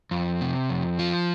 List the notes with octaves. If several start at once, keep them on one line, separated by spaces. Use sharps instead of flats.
F2
C3
F2
F3